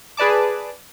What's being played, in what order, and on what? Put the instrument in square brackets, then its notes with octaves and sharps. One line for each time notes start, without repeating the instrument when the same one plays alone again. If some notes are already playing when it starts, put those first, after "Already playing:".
[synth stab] G#4 B4 D5 A5 D6